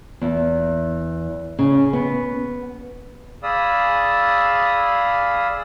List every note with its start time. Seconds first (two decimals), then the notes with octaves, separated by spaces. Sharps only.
0.21 E2
1.59 C#3
1.93 B3
3.43 G#4 D5 F5 B5 D#6 E6